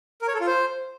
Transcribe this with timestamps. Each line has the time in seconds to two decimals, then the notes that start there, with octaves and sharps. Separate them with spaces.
0.22 A#4
0.28 C#5
0.34 A4
0.41 F4
0.47 C5